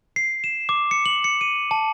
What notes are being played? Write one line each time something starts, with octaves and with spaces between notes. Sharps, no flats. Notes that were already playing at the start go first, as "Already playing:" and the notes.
C7
E7
D6
C#7
F#7
C#7
D#7
A5